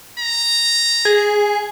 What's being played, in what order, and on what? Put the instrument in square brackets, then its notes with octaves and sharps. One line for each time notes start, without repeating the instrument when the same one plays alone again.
[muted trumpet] A#5
[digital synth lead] G#4